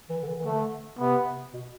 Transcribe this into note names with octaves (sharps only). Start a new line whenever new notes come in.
E3
D3
E3
E3
D3 A3
C3 B3
B2